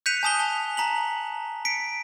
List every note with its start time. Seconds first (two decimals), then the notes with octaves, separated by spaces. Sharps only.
0.06 F#6 G6 B6 C#7 D#7 F7
0.23 G#5 A5 D#6 B6 G7
0.39 A5 G7
0.77 A5 A#5 B6 F#7
1.65 B6 C#7 D7